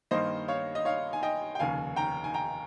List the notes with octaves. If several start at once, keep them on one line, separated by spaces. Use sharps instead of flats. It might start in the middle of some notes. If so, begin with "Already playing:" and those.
G2 D#3 A#3 C5 D#5
C#5 F5
D#5
C#5 F5
G#5
D#5 G5
G5
F1 D#2 C#3 F5 G#5
G5 A#5
G#5
G5 A#5